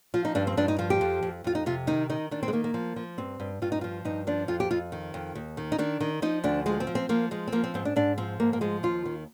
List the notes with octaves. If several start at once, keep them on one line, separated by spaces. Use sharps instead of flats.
F3 F4
D#4
G2 D4
C4
G2 D4
D#4
F3 F4
G4
F2
F2
F2 F4
D#4
C3 F4
D#3 D#4
D#3 D#4
D#3 D4
C4
G#3
D#3 A#3
A#3
F3
F3
G2 C4
G2
G2 F4
D#4
F3 F4
G2 D#4
F3 D4
F2 F4
G4
F2 F4
D#3
F2
D#2
D#3
D#4
D#3 D4
D#3
F3 D#4
D2 D4
F3 G#3
C4
F3
C4
F3 A#3
F3 G#3
C4
F3 A#3
C4
G#2 C4
D4
G#2 D4
F3 C4
G#2 A#3
A#3
F3 G#3
D#2 F4
D#3